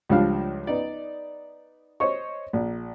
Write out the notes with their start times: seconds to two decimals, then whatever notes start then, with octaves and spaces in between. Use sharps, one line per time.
0.09 C#2 F3 G3 D4 F5
0.67 B3 D#4 D5
2.00 C5 C#5 D#5 C#6
2.53 A#1